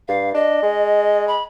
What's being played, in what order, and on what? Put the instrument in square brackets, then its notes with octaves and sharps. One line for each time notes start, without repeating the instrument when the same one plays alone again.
[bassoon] G2 [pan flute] F5
[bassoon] D4 [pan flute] D#5
[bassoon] G#3
[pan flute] B5